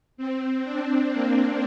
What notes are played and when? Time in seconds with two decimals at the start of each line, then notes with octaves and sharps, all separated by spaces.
0.17 C4
0.64 D4
1.11 A#3